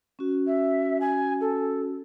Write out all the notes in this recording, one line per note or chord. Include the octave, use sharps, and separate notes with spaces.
C#4 F#4
E5
G#5
A4